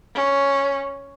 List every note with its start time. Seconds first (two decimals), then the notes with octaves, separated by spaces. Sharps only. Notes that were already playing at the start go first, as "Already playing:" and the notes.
0.15 C#4